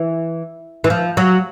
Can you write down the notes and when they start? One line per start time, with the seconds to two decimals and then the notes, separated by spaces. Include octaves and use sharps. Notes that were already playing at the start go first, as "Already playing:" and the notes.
Already playing: E3
0.84 E3
0.90 F3
1.17 F#3